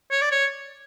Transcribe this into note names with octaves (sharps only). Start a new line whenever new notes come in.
C#5
D5
C#5